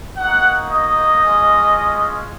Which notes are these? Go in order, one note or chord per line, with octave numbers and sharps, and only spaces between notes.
A#3 D#4 F#4 F#5
D#5
G#3 C#4 F4